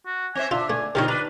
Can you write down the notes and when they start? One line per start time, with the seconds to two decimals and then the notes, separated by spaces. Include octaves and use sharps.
0.06 F#4
0.35 C4 C5 E5 G#5
0.51 D4 F4 E5
0.70 A3 G#5
0.95 D3 B3 D#4 F4 G4 A#4 C#5
1.08 D4 B4 A#5